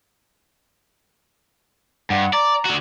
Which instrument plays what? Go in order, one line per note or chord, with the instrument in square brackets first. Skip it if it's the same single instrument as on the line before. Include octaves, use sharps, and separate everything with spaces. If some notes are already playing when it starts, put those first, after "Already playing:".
[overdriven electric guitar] G2 [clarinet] F#5
[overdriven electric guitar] D5 [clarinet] A#5
[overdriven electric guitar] D3 F#4